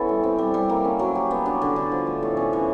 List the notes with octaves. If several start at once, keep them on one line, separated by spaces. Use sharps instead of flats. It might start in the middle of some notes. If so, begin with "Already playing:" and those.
Already playing: E3 B3 C#4 E4 A4
G3
C4
G3
G3
A#3
C#4
F#3
G4
B3
D4
D3
D3
F3
A3
A2
C#4
E3